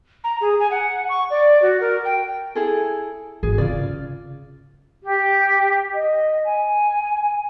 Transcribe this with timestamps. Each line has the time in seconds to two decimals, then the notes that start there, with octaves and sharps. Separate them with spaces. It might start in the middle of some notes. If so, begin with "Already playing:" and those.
0.24 A#5
0.41 G#4
0.60 G#5
0.71 F#5
1.09 C#6
1.30 D5
1.62 F#4
1.81 A#4
2.05 G5
2.55 E4 G#4 A4
3.43 G#1 G#4
3.58 C#3 C#4 F4 D5
5.03 G4
5.94 D#5
6.44 G#5